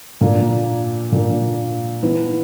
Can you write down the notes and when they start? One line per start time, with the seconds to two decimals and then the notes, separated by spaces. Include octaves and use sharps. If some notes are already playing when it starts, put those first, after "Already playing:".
0.21 A#2 A#3 D4
1.12 A#2 A#3 D4
2.02 E3 B3 E4 B4